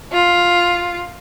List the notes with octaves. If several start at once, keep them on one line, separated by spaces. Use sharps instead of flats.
F4